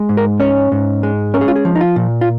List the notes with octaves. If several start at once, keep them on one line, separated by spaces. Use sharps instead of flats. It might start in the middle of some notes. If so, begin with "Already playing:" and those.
Already playing: G#3
G#2
A#4
C#4 C#5
G#2
G#3
C#4 A#4
G#4
F4
G#4
F3
D#4
F4
A#2
F4